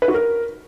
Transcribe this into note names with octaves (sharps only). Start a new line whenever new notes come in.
B4
F#4
A#4